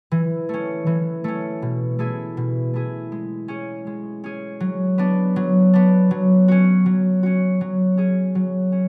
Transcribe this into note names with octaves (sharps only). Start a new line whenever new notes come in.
E3
A3 C#4
E3
A3 C#4
B2
A3 E4 G#4
B2
A3 E4 G#4
G#3
C#4 G#4
G#3
C#4 G#4
F#3
B3 D4
F#3
B3 D4
F#3
C#4 F#4
F#3
C#4 F#4
F#3
C#4 G#4
F#3
C#4